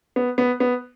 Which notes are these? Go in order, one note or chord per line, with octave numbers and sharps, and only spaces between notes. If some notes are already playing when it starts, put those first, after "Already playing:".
B3
B3
B3